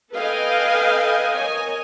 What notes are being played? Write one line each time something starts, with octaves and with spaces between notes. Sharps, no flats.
A4 B4 D#5 F5 G5 G#5
A#4 C#5 D#5 G#5